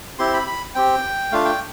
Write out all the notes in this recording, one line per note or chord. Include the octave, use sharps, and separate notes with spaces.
C4 E4 G4 C6
B5
B5
C4 G4 G5
A3 D4 F4 F5
G5